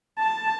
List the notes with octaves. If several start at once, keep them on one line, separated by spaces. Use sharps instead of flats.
A5